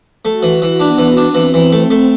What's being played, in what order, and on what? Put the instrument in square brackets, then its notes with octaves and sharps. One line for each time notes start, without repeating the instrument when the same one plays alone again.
[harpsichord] A3 [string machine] F#4
[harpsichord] E3
E3
[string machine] B3 [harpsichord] D4
[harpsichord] E3
D4
[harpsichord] E3 [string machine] C4
[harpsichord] E3
A3
A3